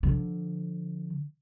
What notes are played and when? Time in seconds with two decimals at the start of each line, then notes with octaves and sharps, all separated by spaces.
0.03 D3 F3